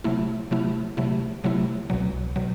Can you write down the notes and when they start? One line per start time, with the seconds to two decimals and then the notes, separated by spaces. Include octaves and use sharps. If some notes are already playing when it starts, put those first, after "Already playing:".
0.04 C3 F#3 A3 E4
0.51 C3 F#3 A3 E4
0.97 C3 F#3 A3 E4
1.44 C3 F#3 A3 E4
1.90 C2 B2 F#3
2.36 B2 F#3